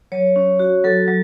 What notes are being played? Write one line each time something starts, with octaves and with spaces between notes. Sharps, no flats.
F#3 C#5
C#4
F#4
F#3 A4
F#3